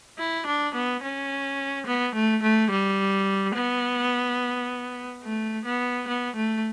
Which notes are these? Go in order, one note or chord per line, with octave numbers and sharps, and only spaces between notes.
E4
D4
B3
C#4
B3
A3
A3
G3
B3
A3
B3
B3
A3